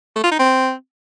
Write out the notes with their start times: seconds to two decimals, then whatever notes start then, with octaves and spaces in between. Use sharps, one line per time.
0.16 A3
0.24 F4
0.31 D#4
0.39 C4